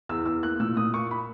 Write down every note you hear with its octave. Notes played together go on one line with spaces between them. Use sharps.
E2 E6
E2 E6
A#3 F#6
A#2 E6
A#2 D#6
A#3 C#6
B5